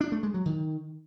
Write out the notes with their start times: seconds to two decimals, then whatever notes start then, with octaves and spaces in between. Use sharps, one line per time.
0.01 D4
0.12 A3
0.23 G#3
0.34 F#3
0.45 D#3